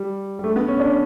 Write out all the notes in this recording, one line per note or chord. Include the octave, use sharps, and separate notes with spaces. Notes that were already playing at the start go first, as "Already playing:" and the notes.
Already playing: G3
G3
A3
B3
C#4
D4